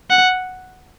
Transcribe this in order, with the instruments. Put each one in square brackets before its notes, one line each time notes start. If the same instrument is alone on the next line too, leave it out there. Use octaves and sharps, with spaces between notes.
[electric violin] F#5